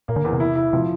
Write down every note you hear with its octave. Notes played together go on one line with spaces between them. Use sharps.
A#2 A#3
D3
E2
C3
E4
E4
C3 F3